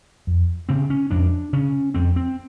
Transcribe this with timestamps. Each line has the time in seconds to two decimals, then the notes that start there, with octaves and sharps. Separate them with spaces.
0.27 F2
0.69 C#3 C4
0.90 C#4
1.11 F2 D4
1.53 C#3 C#4
1.94 F2 C4
2.16 C4